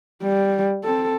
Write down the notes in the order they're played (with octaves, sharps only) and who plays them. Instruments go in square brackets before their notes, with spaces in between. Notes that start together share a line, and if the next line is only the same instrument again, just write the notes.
[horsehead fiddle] G3
C4 A4